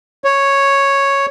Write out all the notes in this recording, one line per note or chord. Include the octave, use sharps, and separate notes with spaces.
C#5